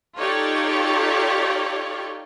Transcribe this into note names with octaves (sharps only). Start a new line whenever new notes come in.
D#4 F4 G4 A4 C#5 D5